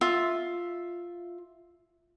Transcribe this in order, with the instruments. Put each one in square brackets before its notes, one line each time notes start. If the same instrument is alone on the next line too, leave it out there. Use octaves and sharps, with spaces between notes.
[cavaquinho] F4 E5